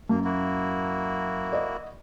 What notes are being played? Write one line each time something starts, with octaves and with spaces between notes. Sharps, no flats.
F#2 A#3
A#3 E4 F#4
D5 D#5